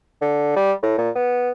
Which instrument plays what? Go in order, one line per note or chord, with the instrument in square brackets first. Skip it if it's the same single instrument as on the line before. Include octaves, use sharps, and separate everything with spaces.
[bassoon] D3
G3
A2
A#2
B3